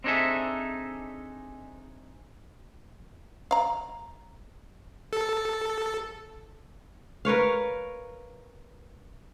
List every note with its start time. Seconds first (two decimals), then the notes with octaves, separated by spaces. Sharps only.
0.04 C4 D4 D#4 G#4 A4 E5
3.51 F5 A#5
5.13 A4
7.25 A#4 B4 C#5 F5